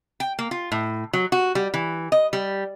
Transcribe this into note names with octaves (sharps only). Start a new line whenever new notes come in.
G5
A#3
F4
A2
F#3
F#4
G3
E3
D#5
G3